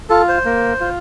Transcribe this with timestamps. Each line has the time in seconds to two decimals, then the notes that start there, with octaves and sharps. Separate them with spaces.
0.10 F4 A4
0.28 C5
0.45 A#3
0.80 F4